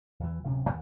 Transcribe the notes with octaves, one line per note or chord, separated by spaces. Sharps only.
E2 E3
D1 D2 C3 C#4
D1 D#2